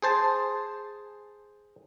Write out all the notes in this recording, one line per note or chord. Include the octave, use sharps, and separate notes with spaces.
G#4 C5 A5